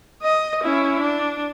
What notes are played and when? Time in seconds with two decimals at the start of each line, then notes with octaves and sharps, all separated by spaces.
0.22 D#5
0.63 C#4 E4
1.00 D4